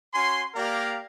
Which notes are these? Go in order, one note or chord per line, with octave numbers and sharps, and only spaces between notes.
C#4 F#4 G#5 C6
A#3 G4 A#4 D5 F5 A#5